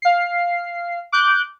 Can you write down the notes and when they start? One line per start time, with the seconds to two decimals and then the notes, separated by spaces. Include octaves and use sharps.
0.02 F5 C7
1.12 D6 F#6 G6